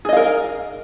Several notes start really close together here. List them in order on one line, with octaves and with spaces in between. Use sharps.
G#4 D#5 F5 A#4